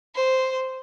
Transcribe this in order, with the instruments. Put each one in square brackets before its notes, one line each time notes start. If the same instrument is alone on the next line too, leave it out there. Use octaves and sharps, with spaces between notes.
[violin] C5